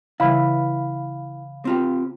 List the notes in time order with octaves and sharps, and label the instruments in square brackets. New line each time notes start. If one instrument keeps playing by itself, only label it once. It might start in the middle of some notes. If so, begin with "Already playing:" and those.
[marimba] C#3 E3 G3 [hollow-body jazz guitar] E4 B4 [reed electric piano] F5 B5
[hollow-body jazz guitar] C4 F4 G4